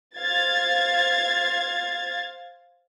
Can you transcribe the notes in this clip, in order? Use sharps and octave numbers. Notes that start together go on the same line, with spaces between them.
C5 F5 G#6 A6